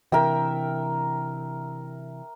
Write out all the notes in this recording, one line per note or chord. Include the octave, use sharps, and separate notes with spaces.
C3 E3 A#4 E5 G5